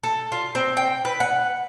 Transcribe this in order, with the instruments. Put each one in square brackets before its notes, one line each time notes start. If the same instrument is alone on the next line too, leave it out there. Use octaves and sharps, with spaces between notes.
[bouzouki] A4
F4
C4
G5
B4
F#5